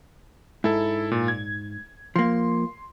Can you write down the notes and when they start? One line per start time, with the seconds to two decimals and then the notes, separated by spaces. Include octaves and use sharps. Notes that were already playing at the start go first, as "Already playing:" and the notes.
0.64 G#2 E4 A4
1.11 A#2
1.28 G#6
2.16 F3 A#3 C6